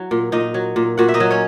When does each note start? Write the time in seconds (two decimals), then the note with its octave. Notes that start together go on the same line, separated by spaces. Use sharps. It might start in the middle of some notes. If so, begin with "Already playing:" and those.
Already playing: F#3 E4
0.11 A#2
0.32 A#2 D#4 D#5
0.54 F#3
0.76 A#2
0.97 A#2 F#4 F#5
1.09 E5
1.14 D#4 D#5
1.20 F#3
1.31 C#4 C#5